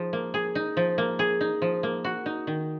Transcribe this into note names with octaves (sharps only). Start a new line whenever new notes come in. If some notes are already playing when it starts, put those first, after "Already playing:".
Already playing: F3 D#4 G#4
A#3
G#4
D#4
F3
A#3
G#4
D#4
F3
A#3
F#4
D#4
D#3